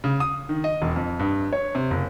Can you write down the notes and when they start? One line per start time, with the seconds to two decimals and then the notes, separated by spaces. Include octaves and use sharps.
0.04 C#3
0.20 D#6
0.49 D#3
0.64 D#5
0.82 E1
0.96 F2
1.19 G2
1.53 C#5
1.75 C3
1.91 F#1